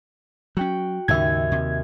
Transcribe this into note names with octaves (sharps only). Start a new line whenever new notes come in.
F#3 C#4 F#4 G5
D#2 G#2 C#3 E5 G#6
C3